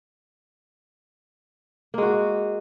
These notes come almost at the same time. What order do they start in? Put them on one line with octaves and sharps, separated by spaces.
A#3 G#3 F#4